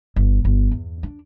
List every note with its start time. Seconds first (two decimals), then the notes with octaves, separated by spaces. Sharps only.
0.16 G1
0.45 G1
0.71 E2
1.03 D4